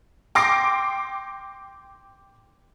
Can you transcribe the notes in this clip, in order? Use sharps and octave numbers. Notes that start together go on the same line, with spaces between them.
G5 C6 D6 A#6 C7 D7